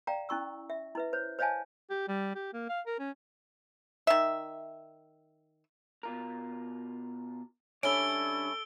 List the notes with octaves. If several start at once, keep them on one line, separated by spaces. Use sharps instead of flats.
D5 F5 G5 A#5
C#4 E4 C#6 E6
E5
E4 B4 E5
C5 C#5
C5 C#5 D#5 F5 G#5 A5
G4
G3
G4
A#3
F5
A#4
C#4
D#3 E5
B2 F4 A#4
G3 C#4 D4 E4 A4 C#5 D7 G7